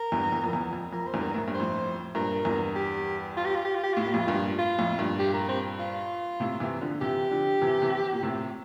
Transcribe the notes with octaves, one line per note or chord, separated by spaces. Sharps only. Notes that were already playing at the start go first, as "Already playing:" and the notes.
Already playing: A#4
E2 G2
E2
F2
E2
F2
F2 A#4
C5
E2 G2
A#4
A2
G2
C5
F2 A2
G2 A#2 A#4
E2 G2
G4
F4
G4
F4
G4
F4
G4
A2 F4
A#2 G4
F2 A2 F4
G2 A#2
F4
F2 A2
G2 A#2
G4
A#4
C4
F4
A2 C3
C3 E3
D3 F3
C3 E3 G4
D3 F3
C3 E3
C3 E3
A#2
A2 C3